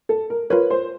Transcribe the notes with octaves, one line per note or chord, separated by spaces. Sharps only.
A4
A#4
F4 A#4 B4 C#5
C5